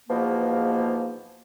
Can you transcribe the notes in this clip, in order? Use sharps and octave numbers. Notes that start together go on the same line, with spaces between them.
E2 G#2 B2 F3 A#3